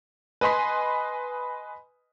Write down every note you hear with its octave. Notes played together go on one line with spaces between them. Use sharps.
B4 D#5 G#5 C6 B6